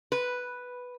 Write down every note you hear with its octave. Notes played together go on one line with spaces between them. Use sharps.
B4